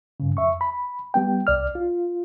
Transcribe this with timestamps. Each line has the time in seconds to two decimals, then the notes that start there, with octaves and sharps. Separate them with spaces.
0.20 G2 C#3
0.37 F2 E5 C#6
0.61 B5
1.14 G3 B3 G5
1.47 C2 D5 F6
1.75 F4